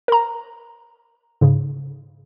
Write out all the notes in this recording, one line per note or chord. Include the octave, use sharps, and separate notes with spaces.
A#4 A#5
G#2 C#3